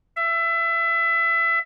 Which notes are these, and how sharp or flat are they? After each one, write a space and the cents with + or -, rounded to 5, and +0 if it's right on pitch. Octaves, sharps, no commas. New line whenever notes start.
E5 +25